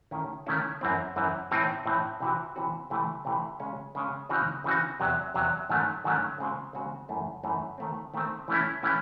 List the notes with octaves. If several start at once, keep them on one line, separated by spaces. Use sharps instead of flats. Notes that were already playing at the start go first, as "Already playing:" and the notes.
D#3 A3 C#4 E4
D#3 A3 C#4 E4
F#2 E3 C4
F#2 E3 C4
A2 E3 C4 D#4
A2 E3 C4 D#4
C3 E3 C4 F#4
C3 E3 C4 F#4
C3 E3 A3 C4
C3 E3 A3 C4
C#3 G#3 C#4
C#3 G#3 C#4
C#3 E3 C4 D#4 F#4
C#3 E3 C4 D#4 F#4
E2 C3 F#3
E2 C3 F#3
G#2 D#3 F#3 A3 C#4
G#2 D#3 F#3 A3 C#4
C#3 G#3 C4 F#4
C#3 G#3 C4 F#4
F#2 E3 A3 D#4
F#2 E3 A3 D#4
D#3 A3 C4
D#3 A3 C4
E3 A3 C#4 E4
E3 A3 C#4 E4